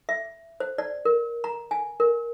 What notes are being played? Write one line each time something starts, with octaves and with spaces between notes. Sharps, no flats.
E5
C5
D5
A#4
A#5
G#5
A#4